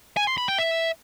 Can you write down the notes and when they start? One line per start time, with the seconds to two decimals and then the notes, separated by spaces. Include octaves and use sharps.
0.17 G#5
0.27 C6
0.38 B5
0.48 G5
0.59 E5